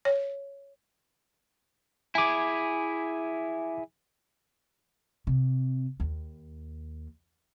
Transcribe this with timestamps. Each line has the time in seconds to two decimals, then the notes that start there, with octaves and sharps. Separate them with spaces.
0.05 C#5
2.15 E4 G#4 G#5 D6
5.27 C3
6.00 D#2